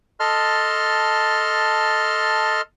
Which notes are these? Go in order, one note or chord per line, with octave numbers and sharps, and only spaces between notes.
A4 D#5 A5 C6 F6